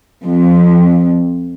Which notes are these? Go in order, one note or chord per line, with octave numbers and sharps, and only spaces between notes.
F2